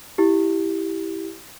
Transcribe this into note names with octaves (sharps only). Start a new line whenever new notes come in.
E4 G4